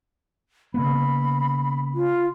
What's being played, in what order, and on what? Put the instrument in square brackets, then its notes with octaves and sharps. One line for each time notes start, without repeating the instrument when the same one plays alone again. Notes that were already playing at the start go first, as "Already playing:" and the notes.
[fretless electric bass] C#3 A#3 B3 [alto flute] B5
[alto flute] F4